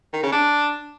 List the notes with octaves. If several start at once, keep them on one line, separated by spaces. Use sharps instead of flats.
D#3
C#3
D4